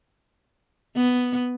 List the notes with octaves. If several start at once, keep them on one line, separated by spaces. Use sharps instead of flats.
B3